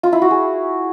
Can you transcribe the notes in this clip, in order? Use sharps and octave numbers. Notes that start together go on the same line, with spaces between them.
F4
E4
F#4
G#4